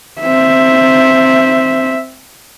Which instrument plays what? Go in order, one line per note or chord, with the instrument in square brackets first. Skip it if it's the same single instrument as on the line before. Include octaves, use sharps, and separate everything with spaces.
[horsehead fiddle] C4 E5